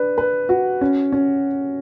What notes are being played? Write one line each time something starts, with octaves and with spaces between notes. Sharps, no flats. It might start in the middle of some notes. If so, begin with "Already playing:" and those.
Already playing: D4 B4
B4
F#4
C#4
C#4